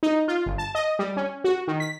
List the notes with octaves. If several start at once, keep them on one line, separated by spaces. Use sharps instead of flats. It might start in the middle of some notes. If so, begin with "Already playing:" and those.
D#4
F4
G1
A5
D#5
G3
C#4
F#4
D#3
B6